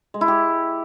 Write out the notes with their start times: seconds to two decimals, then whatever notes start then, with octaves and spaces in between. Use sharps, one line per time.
0.14 G#3
0.21 E4
0.28 G4